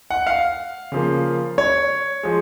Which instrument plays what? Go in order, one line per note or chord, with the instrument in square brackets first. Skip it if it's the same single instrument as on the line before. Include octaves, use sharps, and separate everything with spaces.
[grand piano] F#5
F5
C#3 F3 A#3
C#5
F3 G#3